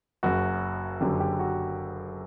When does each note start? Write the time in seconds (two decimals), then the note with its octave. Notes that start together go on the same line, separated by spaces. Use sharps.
0.23 F#1 F#2 F#3 F#4
1.01 F#1 F#2 D3 F#3 G4
1.20 G4
1.39 F#4